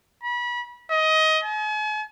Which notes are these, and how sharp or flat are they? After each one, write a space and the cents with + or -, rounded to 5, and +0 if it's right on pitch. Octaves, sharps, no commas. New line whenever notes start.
B5 -30
D#5 +20
G#5 +45